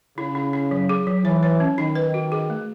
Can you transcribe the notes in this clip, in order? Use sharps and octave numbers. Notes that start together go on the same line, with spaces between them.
C#3 E4
E4
E4
F#3
G#4
F#3
E3 C#5
C#5
C#4
D#3 D#4
B4
F#4
G#4
A3